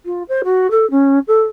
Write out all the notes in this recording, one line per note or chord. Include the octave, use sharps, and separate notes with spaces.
F4
C5
F#4
A4
C#4
A4